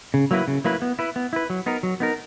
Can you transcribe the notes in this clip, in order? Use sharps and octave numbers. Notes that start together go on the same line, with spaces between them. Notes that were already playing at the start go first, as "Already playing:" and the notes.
C#3
F#3 A#3 E4 B4
C#3
F#3 A#3 E4 B4
B3
E4 B4
B3
E4 B4
F#3
B3 D#4 A#4
F#3
B3 D#4 A#4